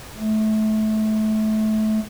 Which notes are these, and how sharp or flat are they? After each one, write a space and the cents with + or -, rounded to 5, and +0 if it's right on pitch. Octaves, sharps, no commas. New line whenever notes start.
A3 -25